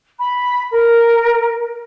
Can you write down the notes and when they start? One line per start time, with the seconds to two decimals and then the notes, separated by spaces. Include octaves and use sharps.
0.19 B5
0.71 A#4